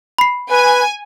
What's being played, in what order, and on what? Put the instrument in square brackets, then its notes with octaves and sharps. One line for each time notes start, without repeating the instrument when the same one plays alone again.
[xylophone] B5 C7
[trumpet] B4 [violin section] G#5